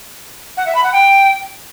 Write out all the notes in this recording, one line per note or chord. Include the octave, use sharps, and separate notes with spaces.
F#5
E5
B5
F#5
G5